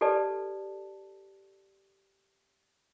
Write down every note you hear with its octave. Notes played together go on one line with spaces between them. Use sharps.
G4 A4 B4 D5 A5